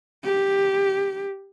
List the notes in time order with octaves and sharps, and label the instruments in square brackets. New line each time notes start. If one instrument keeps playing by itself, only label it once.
[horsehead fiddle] G4